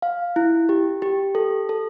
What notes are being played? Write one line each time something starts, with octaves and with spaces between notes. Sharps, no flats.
F5
E4
G4
G4
A4
A4